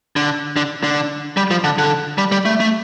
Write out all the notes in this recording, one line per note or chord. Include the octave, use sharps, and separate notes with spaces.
D3
D3
D3
G3
F3
D3
D3
G3
G3
A3
A3